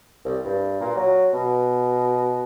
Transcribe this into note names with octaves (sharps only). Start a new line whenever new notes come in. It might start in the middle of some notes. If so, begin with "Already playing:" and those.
C2
G2
A#2
F#3
B2